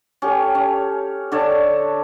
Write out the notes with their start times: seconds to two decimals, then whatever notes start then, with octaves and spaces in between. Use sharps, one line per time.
0.22 C#4 G4 A4
0.55 C#4
1.32 D3 D4 A4 C#5